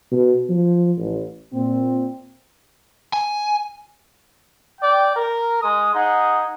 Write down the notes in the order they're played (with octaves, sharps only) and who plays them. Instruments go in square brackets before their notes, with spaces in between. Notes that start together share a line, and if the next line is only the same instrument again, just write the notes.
[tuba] B2
F3
A1
[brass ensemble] A#2 C4
[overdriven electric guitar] G#5
[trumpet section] D5 G5
A#4
G#3 D#6
D#4 G#4 F#5